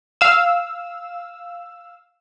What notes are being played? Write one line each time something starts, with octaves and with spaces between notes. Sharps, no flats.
F5 E6